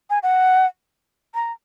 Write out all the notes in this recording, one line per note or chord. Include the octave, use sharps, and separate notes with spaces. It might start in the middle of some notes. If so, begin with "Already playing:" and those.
G#5
F#5
A#5